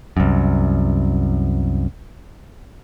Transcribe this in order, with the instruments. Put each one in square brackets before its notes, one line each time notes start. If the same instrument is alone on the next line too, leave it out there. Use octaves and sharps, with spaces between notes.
[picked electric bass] C2 F#2